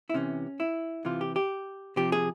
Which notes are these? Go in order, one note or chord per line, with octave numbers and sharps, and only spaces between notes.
E4
C3 E3 C#4
E4
C3 E3 F4
G4
G4
C3 F3 G4
G#4